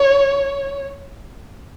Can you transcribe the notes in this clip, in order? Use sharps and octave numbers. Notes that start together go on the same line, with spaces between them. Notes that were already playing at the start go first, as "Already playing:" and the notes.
Already playing: C#5